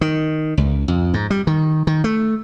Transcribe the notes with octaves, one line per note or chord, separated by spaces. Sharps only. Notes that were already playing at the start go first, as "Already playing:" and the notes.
D#3
C#2
F2
G#2
G3
D#3
D#3
A3